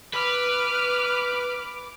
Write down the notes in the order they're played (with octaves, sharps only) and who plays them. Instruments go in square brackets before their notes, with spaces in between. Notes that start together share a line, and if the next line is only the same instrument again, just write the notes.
[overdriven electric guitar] B4 [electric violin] D6 [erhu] F6